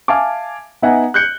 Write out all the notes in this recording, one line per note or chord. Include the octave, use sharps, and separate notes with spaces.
E5 F5 G#5 A5 D6
B3 D#4 E5 F#5 G#5 A#5
F#6 G6 C#7